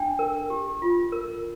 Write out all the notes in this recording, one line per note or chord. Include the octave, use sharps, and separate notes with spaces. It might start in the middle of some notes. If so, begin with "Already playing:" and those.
Already playing: D4 G5
A#4
G4
F4
A#4